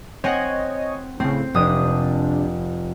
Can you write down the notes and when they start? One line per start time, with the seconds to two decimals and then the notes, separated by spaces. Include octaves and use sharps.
0.24 C4 C#5 D#5 F#5 G#5
1.20 A2 C#3 C4
1.54 F1 C3 D4 D#6